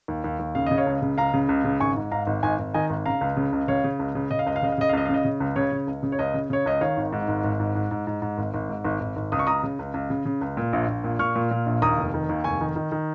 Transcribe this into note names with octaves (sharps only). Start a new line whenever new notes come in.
D#2
D#2
D#2
C#3 F5
C#3 D#5
C#5 F5
C#2
C#3
C#2 F5 A#5
C#3
C#2
C#3
G#1 G#5 C#6
G#2
G#2 F5 A#5
G#1
G#1 D#5 G#5
G#1
D#3 D#5 G#5
G#1
C#3 F5 A#5
C#2
C#3
C#2
C#3 C#5 F5
C#3
C#2
C#3
C#3 D#5
F5
C#2 D#5
F5
C#3 D#5
F5
C#3 D#5
F5
C#2 D#5
F5
C#3
D#5
C#3
C#2
C#3 C#5
C#3
C#2
C#3
C#5
C#2 D#5
C#3
C#3 C#5
C#2 D#5
D#3 C#5 F5
G#1
G#2
G#1
G#1
G#2
G#2
G#2
G#2
G#2
G#1
G#1
G#2
G#1
G#1
G#1
C#2 D#6
C#6
C#2 A#5 D#6
C#3
C#2
C#2
C#3
C#3
C#2
A#2
A#1
A#1
A#2
A#2 C#6 F6
A#2
A#2
A#1
D#2 A#5 D#6
F1
D#3
D#2
F1 G#5 C#6
D#3
D#3
D#3